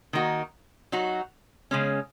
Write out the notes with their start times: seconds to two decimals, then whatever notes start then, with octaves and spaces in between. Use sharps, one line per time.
0.13 D#3 A#3 D#4 F#4
0.92 F#3 D#4 F#4
1.71 C#3 G#3 C#4